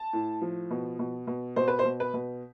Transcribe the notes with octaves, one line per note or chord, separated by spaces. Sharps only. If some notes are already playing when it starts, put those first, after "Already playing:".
Already playing: A5
A2
F3
B2
B2
B2
B2 C5
B4
C5
B2
B4
B2